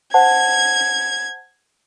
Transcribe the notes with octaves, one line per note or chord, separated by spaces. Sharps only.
C5 F#5 A5 G#6